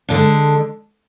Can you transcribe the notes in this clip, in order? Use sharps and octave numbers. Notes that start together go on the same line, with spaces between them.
D3 G#3 D4